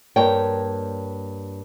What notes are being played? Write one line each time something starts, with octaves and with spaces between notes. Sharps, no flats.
G2 A#3 C#5 G5